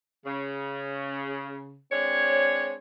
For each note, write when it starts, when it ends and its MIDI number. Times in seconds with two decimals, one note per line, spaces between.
0.25 1.79 49
1.91 2.76 56
1.91 2.76 60
1.91 2.76 62
1.91 2.76 73